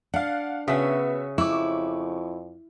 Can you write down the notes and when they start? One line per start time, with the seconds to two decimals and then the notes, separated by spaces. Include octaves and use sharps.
0.14 D4 F5 F#5
0.68 C#3 B3 C#4 F#4 E5 B6
1.38 F2 E4 C#6 D6